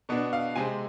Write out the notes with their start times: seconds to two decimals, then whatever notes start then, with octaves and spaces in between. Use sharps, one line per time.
0.09 B2 B3 D4
0.33 F5
0.56 C3 G#3 C4 G#5